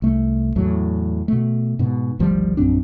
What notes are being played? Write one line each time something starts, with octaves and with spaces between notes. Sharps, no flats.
C2 A3
E2 A2 F#3
B2 A3
G#2 B2
G#1 D2 F3 G3
A#1 F#2 C4 D4